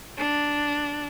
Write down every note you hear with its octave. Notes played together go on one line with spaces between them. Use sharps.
D4